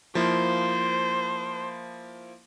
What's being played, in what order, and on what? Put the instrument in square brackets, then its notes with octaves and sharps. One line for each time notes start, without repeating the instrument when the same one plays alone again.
[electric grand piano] F3 A#3 E4 [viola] C5